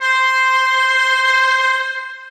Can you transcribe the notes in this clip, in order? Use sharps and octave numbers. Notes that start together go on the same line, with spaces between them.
C5 C6